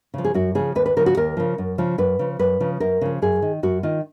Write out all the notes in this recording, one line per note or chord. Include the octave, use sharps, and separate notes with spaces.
C#3 F3
G#4
F#2 F#4
C#3 F3 G#4
D#2 B4
B4
C#3 F3 A#4
F#4
D#2 A#4
C#3 F3
F#2
C#3 F3
F#2 B4
C#3 F3
F#2 B4
C#3 F3
F#2 A#4
C#3 F3
F#2 G#4
D#3
F#2 F#4
D#3 F4